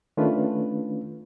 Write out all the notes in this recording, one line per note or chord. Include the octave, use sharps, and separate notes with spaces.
D#3 A3 C#4 D4 F4 B4